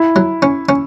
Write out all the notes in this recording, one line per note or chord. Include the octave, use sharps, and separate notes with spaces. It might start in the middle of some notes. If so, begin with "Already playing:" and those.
Already playing: E4
F#3
C#4
C#4